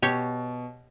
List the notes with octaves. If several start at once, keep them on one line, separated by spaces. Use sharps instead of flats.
B2 G4 C#5